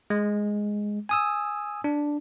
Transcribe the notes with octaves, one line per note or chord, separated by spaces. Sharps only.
G#3
G#5 D#6 E6
D4